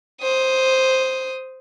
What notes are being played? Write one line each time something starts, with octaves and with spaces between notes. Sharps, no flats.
C5 D#6